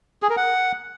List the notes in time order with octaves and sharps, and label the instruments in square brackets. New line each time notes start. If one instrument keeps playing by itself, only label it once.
[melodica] G#4
A#4
F#5